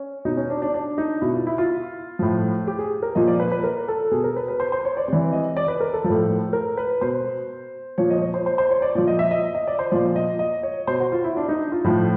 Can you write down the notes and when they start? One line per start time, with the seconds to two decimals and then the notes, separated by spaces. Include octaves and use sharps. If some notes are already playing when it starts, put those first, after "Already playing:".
Already playing: C#4
0.25 B2 D#4
0.37 C#4
0.50 D4
0.62 D4
0.74 D4
0.98 D#4
1.21 B2 E4
1.34 F4
1.47 E4
1.58 F4
2.19 A2 F3
2.67 G4
2.79 G#4
3.02 A#4
3.15 A#2 F3 D#5
3.27 D5
3.40 B4
3.51 B4
3.63 A#4
3.88 A4
4.11 B2 G#4
4.24 A#4
4.36 B4
4.48 B4
4.60 C5
4.72 C5
4.85 C#5
4.97 D5
5.08 C3 E3 D5
5.32 D#5
5.57 D5
5.68 B4
5.81 A#4
5.93 A4
6.04 F3 A4
6.10 A2
6.53 A#4
6.77 B4
7.01 B2 C5
7.98 A#2 F3 C#5
8.10 D#5
8.22 C#5
8.34 C5
8.46 C5
8.58 C5
8.71 C#5
8.82 D5
8.95 A#2 F3 D5
9.07 D#5
9.19 E5
9.31 D#5
9.55 D#5
9.67 D5
9.79 C5
9.91 A#2 F3 D5
10.16 D#5
10.39 D#5
10.63 C#5
10.87 B2 C5
11.00 F#4
11.12 F4
11.24 E4
11.37 D4
11.49 D#4
11.72 F4
11.84 A2 F3